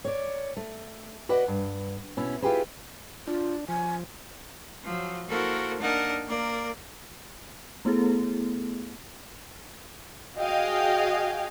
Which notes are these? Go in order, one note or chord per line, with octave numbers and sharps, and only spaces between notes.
C#5 D5
A3
F#4 B4 D5 D#5 F#5
G2
B2 C#4 E4
E4 F4 G4 G#4 B4 C5
D4 F4
F3 G#5
F3 F#3
A#3 E4 F#4 A4 A#4 C5
A#3 D4 D#4 A#4 F#5 A5
A#3 A#4 D5
A3 B3 E4 G#4 A4
F#4 G#4 D#5 F5 G5